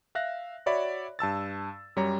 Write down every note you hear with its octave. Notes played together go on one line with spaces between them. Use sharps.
E5 F5 F#6 A#6
F#4 C#5 D5 E5 B5
G2 A5 E6 A6
F#2 G3 C#5 A#5